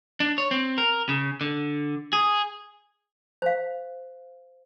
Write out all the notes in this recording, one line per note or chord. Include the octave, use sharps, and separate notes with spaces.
D4
C#5
C4
A#4
C#3
D3
G#4
C5 F5